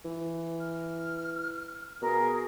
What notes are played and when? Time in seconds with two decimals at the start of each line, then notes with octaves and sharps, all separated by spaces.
0.05 E3
0.60 F6
2.02 B2 G#4 A#4